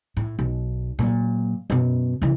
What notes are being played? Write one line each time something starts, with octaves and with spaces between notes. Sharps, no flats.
A2
B1
A#2 F#3
F#2 B2
C#3 E3